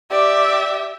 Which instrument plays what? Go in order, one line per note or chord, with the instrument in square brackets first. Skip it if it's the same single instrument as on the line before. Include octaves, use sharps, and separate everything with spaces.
[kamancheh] G4 D5 [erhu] E5